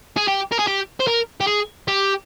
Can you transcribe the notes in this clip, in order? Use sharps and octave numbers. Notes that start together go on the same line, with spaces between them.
G#4
G4
A#4
G#4
G4
C5
A#4
G4
G#4
G4